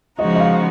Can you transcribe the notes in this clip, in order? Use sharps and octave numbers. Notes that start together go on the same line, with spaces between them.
C#3 F3 G#3 D#4 F#4 D#5
D#5
F5